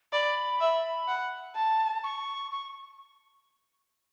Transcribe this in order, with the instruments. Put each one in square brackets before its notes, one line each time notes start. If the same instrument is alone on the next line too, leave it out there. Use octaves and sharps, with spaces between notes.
[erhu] D5 [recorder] B5
[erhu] E5
F#5
A5
[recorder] C#6
C#6